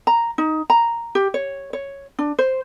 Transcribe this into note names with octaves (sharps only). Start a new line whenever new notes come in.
A#5
D#4
A#5
G4
C#5
C#5
D4
C5